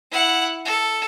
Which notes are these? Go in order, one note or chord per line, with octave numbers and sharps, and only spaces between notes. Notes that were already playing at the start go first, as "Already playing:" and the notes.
E4 F#5
A4